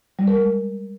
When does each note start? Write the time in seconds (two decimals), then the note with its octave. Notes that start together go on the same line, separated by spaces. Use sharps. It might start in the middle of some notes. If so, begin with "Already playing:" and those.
0.19 G3
0.28 A#4
0.36 G#3